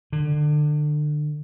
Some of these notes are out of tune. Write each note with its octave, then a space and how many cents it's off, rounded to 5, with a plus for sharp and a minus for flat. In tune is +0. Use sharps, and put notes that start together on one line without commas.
D3 +30